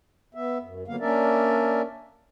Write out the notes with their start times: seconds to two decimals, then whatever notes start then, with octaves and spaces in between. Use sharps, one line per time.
0.35 B3 E5
0.62 F#2
0.88 D3 F#3 A#3 B3 F5
1.00 A#3 C#4 D4 A#4 D5 E5